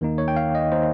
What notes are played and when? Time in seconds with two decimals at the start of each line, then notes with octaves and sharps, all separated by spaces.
0.01 D#2 D#3 A#3 D#4
0.18 C#5
0.28 G5
0.36 F5
0.55 D#5
0.72 D#3 A#3 D#4 C5